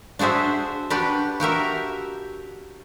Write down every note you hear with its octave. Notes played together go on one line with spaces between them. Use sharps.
D4 F#4 G#4 C5 E5
D4 F#4 G4 B4
F#4 G4 A#4 E5